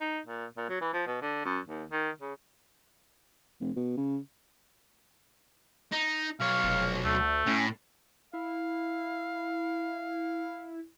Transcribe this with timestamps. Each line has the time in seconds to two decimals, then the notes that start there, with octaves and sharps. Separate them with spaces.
0.01 D#4
0.26 A#2
0.57 A#2
0.69 F#3
0.81 E3
0.93 F3
1.06 B2
1.22 D3
1.45 F#2
1.68 D#2
1.91 D#3
2.21 C#3
3.61 F1
3.76 B2
3.97 C#3
5.92 D#4
6.40 B1 C#5 F5
6.64 F1
7.05 D2 A3
7.47 A2 C#4
8.33 E4 F5